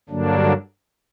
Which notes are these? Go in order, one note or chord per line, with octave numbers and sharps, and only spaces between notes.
G2 D3 F#3 A#3 D4